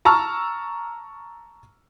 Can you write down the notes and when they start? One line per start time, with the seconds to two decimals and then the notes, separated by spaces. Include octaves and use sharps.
0.05 A5 A#5 C#6 E6 F6